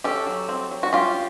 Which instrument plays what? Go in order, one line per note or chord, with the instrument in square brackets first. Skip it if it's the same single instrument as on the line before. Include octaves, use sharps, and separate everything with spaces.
[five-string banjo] C#4 G4 A4
F#3
C4
F#3
F#4
C#4 F4 G4